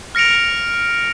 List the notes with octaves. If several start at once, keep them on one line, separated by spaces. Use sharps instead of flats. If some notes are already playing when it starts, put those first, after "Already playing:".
F6 A#6 C#7 D7 F7